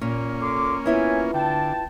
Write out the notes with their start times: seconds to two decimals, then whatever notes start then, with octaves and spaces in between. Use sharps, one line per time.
0.01 A#2 A#3 C#4
0.41 A4 C6 D6
0.86 B3 E4 F4 C#5 E5 G#5
1.34 D3 G5 A5